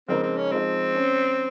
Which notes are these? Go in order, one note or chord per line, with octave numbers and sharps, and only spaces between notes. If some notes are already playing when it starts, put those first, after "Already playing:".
F2 C#3 G#3 C4 D#4 A#4
C4
C#4
F3 G#3 C4 D#4
C#4